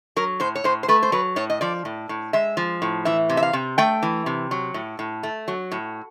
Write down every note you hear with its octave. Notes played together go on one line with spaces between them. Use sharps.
F#3 A#4
A2 C5
C#5
A2 C5
C5
A3 B4
C5
F#3 B4
A2 C#5
D#5
F3 D5
A2
A2
G#3 E5
F3
A2
E3 E5
C3
E5
F5
C3
A3 G5
E3
C3
F#3
A2
A2
A3
F#3
A2